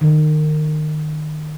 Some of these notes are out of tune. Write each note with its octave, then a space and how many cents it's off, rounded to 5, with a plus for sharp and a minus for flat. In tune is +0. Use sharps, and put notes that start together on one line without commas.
D#3 -25